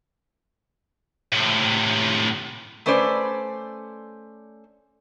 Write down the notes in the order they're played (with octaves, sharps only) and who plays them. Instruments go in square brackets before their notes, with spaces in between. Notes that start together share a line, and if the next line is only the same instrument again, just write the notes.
[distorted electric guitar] A2 C3
[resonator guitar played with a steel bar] A3 C#4 B4 C5 D5